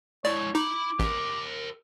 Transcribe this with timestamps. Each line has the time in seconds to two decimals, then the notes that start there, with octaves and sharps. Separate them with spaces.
0.25 G#3 E4 C#5 D5
0.55 D#4 E4 B5 D6
1.00 A1 G4 A#4